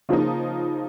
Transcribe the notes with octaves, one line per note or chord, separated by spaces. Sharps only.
C#3 F3 A#3 D#4